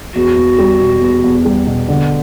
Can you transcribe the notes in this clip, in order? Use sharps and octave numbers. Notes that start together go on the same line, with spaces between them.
E2 F#4
E2
G3
B2
E2
E2
G3
B2
D3